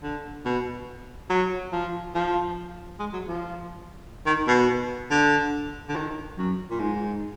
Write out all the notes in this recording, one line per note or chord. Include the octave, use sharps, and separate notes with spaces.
D3
B2
F#3
F3
F3
G#3
F#3
F3
D#3
B2
D3
D3
D#3
F#2
A#2
G#2